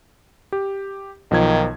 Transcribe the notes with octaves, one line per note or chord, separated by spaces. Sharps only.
G4
B1 D#3 F3 G#6